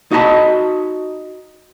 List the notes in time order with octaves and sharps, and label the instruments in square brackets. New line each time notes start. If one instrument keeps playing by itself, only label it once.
[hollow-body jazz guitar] D#4 F#4 D#5 A5 B5